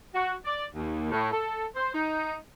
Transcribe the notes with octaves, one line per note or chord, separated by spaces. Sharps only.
F#4
D5
D#2
A2
A4
C5
D#4